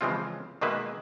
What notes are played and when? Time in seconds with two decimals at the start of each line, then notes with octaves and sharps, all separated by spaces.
0.01 C#3 E3 F3 G#3 C4 F4
0.61 B2 D#3 G#3 A#3 B4 E5